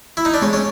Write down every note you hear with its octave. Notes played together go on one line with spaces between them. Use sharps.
E4
D#4
D4
G#3 C#4
C#4